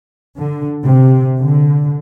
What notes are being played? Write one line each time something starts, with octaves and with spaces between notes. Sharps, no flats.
D3
C3
D3